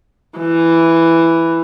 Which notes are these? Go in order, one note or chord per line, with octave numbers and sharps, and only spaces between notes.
E3